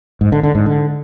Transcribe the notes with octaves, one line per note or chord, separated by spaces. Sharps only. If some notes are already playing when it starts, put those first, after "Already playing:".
G#2
D3
D3
G#2
D3